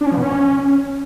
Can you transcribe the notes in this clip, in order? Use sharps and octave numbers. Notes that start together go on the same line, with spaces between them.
D4
C#4
F3
B2
C#4